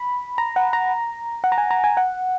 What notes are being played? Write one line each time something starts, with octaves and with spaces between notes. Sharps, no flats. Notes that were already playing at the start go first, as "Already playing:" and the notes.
Already playing: B5
A#5
F#5
A#5
F#5
A#5
G#5
A#5
G#5
F#5